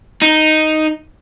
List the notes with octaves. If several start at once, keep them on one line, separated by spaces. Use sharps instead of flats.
D#4